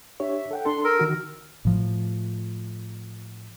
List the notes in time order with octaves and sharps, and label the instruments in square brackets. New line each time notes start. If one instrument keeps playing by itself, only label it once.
[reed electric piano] D4 G4 C#5 [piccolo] E5
[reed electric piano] A4 F#5 G5
[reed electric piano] D4 A4 [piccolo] C6
[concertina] A#4 [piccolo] E6
[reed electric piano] D#3 F#4
[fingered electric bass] A2 F3